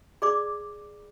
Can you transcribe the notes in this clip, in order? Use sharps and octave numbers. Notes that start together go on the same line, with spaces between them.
G#4 D5 D6